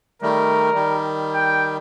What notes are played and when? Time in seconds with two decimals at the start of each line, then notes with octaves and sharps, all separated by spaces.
0.22 D#3 G3 A3 A#4
0.74 D#3 G3
1.34 G5